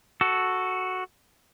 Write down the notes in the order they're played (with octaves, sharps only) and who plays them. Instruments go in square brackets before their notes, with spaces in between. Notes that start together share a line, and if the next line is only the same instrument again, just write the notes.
[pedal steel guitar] F#4 A4